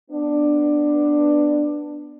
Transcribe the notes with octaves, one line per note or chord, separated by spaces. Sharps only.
B3 D4